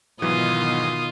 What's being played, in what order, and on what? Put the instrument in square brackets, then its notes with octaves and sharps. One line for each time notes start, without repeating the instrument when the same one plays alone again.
[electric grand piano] G#2 E3 F#3 [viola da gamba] B2 D#3 [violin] F4 [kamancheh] D#6